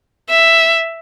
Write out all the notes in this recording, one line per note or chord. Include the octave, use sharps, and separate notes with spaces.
E5